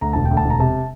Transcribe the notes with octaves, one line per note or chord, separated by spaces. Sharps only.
D2 A#5
E1 A5
G5
D2
A5
E1 A#5
C3 A5